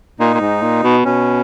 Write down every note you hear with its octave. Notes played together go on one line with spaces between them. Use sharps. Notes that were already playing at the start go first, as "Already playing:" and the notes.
A#2 D#4
A#2
G#2
A#2
B2
B2 C#4